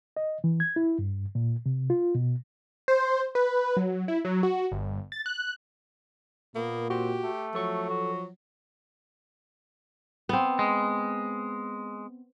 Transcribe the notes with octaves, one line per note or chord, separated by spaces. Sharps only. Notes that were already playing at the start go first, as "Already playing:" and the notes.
D#5
E3
G#6
E4
G2
A#2
C3
F4
B2
C5
B4
F#3
E4
F#3
F#4
G1
A6
F#6
A#2 A#3 B3
C4 F#4 G4
A3
F3 F#3 A4 C#6
F#4
B3 C4
G#3